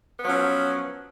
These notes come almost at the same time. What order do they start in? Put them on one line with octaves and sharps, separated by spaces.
B3 F#3 C#4 F3